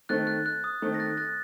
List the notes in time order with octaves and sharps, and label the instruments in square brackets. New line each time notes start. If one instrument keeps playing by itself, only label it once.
[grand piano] D#3 A3 C4 [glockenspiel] F#6 A6
[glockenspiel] F#6
F#6
D#6
[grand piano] D#3 A3 C4
[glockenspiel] A#6
F#6 A6
F#6 A6